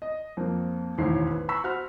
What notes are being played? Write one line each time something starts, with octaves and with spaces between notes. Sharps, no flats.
D#5
F2 A#3 C4
E1 A1 D#2 A2 C5 C7
B4
A#5 B5 C#6 E6 B6
F#4 C5 F6